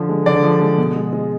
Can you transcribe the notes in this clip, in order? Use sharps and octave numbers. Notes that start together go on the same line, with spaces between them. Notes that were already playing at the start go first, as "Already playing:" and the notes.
Already playing: D3 F3
G#3
D3 D5
F3
G#3
B2
G#3
G#3